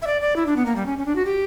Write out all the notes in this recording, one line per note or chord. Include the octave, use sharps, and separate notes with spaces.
E5
D5
D5
E4
D4
B3
A#3
G3
C#4
C#4
D4
F#4
G4